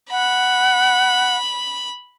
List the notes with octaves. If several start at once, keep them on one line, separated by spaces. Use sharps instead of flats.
F#5 B5